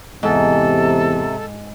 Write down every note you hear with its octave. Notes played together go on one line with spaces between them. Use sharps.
E2 G#2 C3 A4